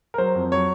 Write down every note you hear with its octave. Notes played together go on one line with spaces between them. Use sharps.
A#4
F#3 C5
F2
F#3 C#5